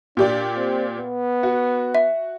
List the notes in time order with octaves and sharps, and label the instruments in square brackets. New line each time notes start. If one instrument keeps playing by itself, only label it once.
[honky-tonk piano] A#2 G4 D5 [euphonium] D4
[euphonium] C4
B3
[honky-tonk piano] F#4
[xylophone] E5